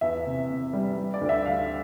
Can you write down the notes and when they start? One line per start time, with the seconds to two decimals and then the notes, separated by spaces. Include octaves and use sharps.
0.01 E2 E5
0.26 C3
0.50 C3
0.73 G3
0.97 G3
1.14 D5
1.21 D2
1.29 E5
1.45 G3 F5